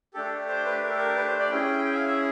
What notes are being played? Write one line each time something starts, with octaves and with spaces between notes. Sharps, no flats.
A3 D4 G4 A4
A4
C5
B4
A#4
A4
A#4
B4
C5
D5
C#4 E4 G#4 G5
G5
E5
F5
E5